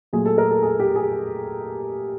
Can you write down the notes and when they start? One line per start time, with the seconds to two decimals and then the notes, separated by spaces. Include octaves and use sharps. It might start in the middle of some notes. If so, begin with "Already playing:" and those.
0.13 A#2 F#3 A3 G#4
0.26 A4
0.38 A#4
0.50 A4
0.62 G#4
0.80 G4
0.96 G#4